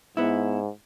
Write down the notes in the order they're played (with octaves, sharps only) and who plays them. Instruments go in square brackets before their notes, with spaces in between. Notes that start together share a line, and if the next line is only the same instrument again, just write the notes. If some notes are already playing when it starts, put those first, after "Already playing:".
[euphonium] G#2 [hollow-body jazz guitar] B3 E4